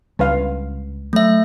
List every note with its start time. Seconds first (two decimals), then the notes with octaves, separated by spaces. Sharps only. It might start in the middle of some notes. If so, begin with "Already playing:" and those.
0.19 C#2 G3 B4 F5
1.13 F#3 A3 E5